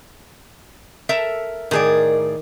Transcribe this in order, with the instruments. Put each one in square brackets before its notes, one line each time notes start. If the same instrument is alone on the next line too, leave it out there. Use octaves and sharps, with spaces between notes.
[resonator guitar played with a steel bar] A4 A#4 E5
[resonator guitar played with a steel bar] A2 G#4 D5 [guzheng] D#3